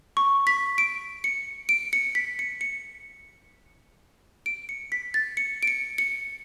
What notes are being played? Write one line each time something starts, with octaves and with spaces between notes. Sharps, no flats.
C#6
B6
D7
C#7
D7
C#7
B6
C#7
C#7
D7
C#7
B6
A6
C#7
D7
C#7
C#7